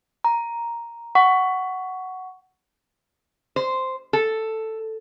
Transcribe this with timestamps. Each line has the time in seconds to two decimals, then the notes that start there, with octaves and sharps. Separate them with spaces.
0.24 A#5
1.15 F#5 C#6
3.56 C5
4.13 A4